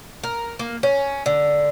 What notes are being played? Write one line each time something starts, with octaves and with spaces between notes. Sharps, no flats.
A#4
A#3
C#4
D3